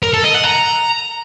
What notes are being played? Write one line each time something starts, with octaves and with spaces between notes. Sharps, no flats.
A#4
A4
D#5
F#5
A#5